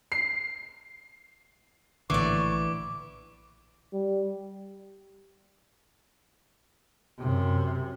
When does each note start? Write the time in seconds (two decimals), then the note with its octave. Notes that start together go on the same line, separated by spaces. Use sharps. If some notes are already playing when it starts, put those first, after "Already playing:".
0.12 C7
2.10 A#1 A2 D3 E3 D5 C#6 D6
3.93 G3
7.19 F#2 C3